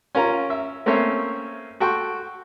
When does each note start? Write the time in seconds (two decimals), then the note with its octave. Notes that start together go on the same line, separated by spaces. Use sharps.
0.15 C#4 F4 A#4 A#5
0.50 E5
0.86 A3 A#3 C4 C#4 C#5 E5
1.80 F#4 A4 G5 C6 C#6